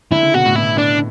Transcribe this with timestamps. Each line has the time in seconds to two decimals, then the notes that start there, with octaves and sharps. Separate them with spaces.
0.12 D3 E4
0.22 C#3
0.34 B2 F#4
0.46 A2
0.56 B2 E4
0.78 D4